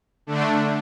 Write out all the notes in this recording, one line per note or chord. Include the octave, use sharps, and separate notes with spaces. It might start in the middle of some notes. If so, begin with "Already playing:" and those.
D3 A3 D4